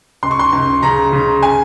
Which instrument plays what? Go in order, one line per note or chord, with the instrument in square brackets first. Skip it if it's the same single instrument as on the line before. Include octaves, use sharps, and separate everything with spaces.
[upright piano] C#2 C6
C#6
C6
C#2
C#3 A#5
C#3
G#5